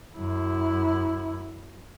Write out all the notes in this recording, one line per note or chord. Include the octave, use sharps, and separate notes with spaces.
F#2 E4